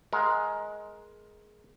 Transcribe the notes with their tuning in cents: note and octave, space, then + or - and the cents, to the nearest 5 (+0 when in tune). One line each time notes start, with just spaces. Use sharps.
G#3 +15 A#4 +10 F#5 +0